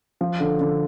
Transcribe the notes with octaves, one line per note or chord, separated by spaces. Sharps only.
F3
D3
D3